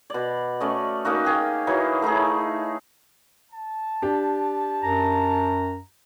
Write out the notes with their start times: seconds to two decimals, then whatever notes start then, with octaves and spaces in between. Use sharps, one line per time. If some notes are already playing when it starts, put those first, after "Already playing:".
0.10 B2 D5
0.60 A3 C#4 D5 D#5
1.05 A#3 C#4 D#4 F#4
1.25 A#3 G#4 G5
1.67 E3 F#3 D#4 G#5
2.02 A3 D#4 E4 G#4
3.52 A5
4.02 D4 G4
4.83 F#2 A#5